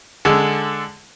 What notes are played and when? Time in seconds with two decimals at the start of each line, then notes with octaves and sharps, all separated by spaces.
0.25 D3 G#3 A4